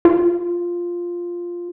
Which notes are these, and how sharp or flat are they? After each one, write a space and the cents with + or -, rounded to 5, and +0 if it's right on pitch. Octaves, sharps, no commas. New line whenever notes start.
F4 +0